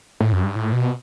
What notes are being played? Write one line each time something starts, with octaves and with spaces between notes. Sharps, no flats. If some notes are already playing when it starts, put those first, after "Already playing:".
A2
F#2
G2
A2
B2